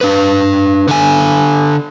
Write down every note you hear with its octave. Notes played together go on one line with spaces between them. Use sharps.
D4 B4
D3 G#5